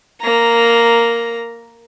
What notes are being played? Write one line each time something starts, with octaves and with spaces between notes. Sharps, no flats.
A#3 A#5